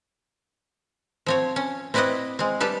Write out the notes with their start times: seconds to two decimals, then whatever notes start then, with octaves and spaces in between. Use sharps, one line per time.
1.26 F3 C4 C#5
1.56 C#4
1.94 C4 E4 B4 D5 D#5 F#5
2.39 G#3 C4
2.60 G3 G4 A4 B4